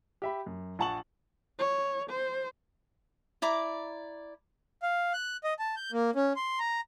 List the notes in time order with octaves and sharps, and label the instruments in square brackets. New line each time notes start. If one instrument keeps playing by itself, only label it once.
[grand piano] G4 E5 B5
F#2
A#1 F#5 A5 C#6 F#7
[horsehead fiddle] C#5
C5
[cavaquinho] E4 D5 A#5 D6
[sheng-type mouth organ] F5
F#6
D#5
A5
G6
A#3
C#4
C6
A#5